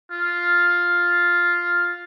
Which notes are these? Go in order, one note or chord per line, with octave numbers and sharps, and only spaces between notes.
F4